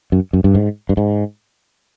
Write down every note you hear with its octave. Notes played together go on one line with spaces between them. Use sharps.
F#2
F#2
G2
G#2
G2
G#2